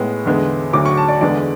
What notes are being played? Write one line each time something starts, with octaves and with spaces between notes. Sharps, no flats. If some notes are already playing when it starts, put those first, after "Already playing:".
Already playing: A2 G#3 B3
E2 D3 G#3 B3
D2 D3 F#3 D6
C#6
A5
D5
E2 D3 G#3 B3 D5